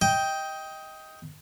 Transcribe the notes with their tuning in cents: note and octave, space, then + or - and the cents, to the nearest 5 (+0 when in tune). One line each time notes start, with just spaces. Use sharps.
D#5 +20 G5 +0